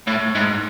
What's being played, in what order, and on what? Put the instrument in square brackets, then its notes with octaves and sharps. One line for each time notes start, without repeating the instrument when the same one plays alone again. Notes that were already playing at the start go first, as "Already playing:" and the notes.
[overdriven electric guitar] A2
G#2